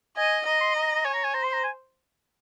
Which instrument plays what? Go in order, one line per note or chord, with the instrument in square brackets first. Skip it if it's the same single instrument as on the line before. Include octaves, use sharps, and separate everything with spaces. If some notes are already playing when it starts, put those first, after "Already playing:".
[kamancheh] D#5 [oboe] G#5
[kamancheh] D#5 [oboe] A#5
[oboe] C6
A#5
A#5
[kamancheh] C#5 [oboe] G#5
[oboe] A#5
G#5
[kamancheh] C5 [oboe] A#5
[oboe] C6
A#5
G#5